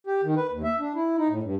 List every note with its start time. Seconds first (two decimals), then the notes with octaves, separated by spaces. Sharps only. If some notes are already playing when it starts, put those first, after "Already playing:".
0.07 G4
0.23 D#3
0.37 B4
0.51 D#2
0.64 E5
0.79 D4
0.95 E4
1.18 D#4
1.29 A2
1.43 G2